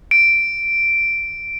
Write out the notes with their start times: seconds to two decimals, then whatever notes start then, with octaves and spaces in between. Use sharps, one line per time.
0.11 D7